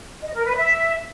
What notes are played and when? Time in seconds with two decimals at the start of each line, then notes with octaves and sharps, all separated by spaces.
0.22 D#5
0.34 A#4
0.45 B4
0.56 E5